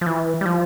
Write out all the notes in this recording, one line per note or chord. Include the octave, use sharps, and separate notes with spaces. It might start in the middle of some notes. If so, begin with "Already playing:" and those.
F3
E3
G3
F3